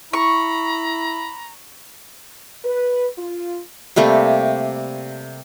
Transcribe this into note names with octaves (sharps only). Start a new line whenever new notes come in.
E4 A#5 B5 C#6
B4
F4
C3 G3 A3 A#3